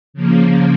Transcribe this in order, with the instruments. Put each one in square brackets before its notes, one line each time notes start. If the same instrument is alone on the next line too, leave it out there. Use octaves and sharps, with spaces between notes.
[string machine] C#3 F3 A#3